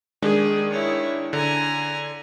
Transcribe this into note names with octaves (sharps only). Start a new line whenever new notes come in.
D#3 G#3 D4 G#4
E4 C#5
D3 G#5 A#5